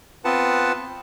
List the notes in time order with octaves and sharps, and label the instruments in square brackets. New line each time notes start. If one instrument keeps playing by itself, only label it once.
[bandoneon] B3 C4 F4 B4 F#5 A5